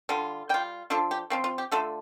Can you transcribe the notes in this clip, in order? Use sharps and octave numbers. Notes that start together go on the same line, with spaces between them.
D3 G3 F4
G3 F4 G5
F3 D4 F4 A4
G4
F3 C4 F4
F4
G4
D3 A3 F4 A4